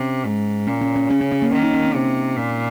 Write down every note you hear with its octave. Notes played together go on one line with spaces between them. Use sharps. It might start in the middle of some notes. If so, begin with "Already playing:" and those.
Already playing: C3 C#4
G#2
A#2 C#4
C#4
C#4
C#3 C#4
C#4
C#4
A#3
D#3 C#4
D#4
C#4
C4
C3
A#2